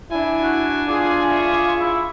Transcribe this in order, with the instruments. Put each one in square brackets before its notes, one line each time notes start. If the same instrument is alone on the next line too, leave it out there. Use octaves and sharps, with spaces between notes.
[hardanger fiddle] D4 G#5 [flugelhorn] E4
[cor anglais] F#4
[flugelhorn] F4 [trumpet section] G#4 [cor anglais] D5
[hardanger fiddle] E5 C#6
[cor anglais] E4